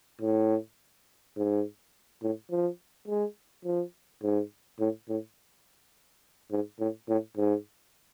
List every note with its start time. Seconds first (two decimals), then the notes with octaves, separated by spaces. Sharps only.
0.22 A2
1.37 G#2
2.23 A2
2.51 F3
3.08 G#3
3.65 F3
4.23 G#2
4.80 A2
5.09 A2
6.52 G#2
6.80 A2
7.09 A2
7.37 G#2